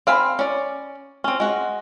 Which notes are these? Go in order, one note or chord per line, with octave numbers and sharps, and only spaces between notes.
C4 F5 G#5 B5
C#4 D5
C4 C#4
G#3 F#4